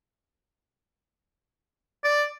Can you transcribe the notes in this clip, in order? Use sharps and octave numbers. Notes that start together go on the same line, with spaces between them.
D5